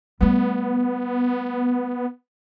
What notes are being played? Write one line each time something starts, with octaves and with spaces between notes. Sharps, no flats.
G3 A3 B3